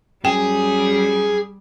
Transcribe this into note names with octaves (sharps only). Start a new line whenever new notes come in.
F#2 G3 G#4 G5